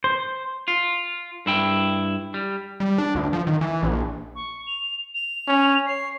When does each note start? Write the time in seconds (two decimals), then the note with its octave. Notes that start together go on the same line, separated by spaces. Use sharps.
0.04 C5
0.68 F4
1.46 G2 E4 G5
2.34 G3
2.80 G3
2.98 D4
3.15 D2
3.33 F3
3.47 D#3
3.61 E3
3.83 A#1
4.35 C#6
4.67 F7
5.15 F7
5.48 C#4
5.86 C#5 C7